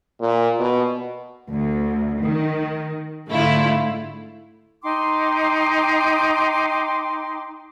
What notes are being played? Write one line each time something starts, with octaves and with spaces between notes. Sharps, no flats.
A#2
B2
D2
D#3
G#2 D3 A3 E4 F4
D#4 G5 C6 D6